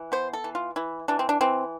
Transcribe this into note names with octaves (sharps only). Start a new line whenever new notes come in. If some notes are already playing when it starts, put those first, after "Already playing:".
Already playing: E3
B3 C5
A4
E3
F4
E3 E4
E3 D4
C4
D4
E3 C4